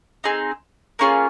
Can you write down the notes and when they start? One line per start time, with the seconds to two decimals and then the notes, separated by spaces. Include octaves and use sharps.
0.24 C4 D#4 G#4
0.99 A#3 C#4 F4 G#4